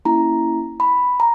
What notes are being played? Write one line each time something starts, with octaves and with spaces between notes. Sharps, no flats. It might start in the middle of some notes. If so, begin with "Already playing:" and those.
A#3 C#4 E4 A#5
B5
A#5